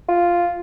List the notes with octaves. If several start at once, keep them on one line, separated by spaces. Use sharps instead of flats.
F4